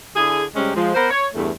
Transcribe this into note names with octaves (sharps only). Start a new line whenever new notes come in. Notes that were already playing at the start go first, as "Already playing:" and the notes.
D3 E4 G#4
C3 G3 G#3 C4 C#4
F3 G#3
B3 A#4 C5
C#5
E2 G2 A3